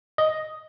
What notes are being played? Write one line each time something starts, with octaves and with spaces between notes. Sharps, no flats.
D#5